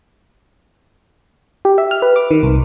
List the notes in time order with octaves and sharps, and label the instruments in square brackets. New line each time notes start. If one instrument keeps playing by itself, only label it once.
[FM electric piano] G4
E5
F6
B4
D6
D#3
C2